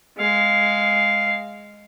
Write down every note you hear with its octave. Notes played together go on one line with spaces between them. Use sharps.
G#3 F5